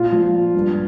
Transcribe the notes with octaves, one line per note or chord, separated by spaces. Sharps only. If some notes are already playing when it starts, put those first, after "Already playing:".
Already playing: A#2 F4
F3
A#2
G2